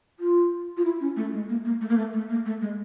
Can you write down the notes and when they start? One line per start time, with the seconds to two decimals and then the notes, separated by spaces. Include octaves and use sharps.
0.20 F4
0.77 F4
0.85 E4
1.01 C#4
1.16 A3
1.33 G#3
1.49 A#3
1.65 A#3
1.81 A3
1.89 A#3
1.97 A3
2.13 A3
2.29 A#3
2.45 A3
2.61 G#3